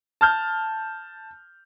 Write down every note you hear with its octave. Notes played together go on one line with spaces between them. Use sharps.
A5 F6 G6